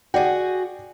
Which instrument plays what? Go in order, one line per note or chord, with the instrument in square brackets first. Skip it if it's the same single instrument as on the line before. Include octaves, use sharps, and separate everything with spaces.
[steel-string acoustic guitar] F#4 G#4 [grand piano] D5 G5